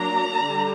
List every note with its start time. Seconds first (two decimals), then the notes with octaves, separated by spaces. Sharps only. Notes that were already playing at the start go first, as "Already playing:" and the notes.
Already playing: F#3 A#3 D4 A#5
0.42 D3 G3